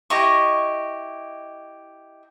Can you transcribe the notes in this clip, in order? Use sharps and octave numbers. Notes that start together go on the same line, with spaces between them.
E4 G4 D#5 C#6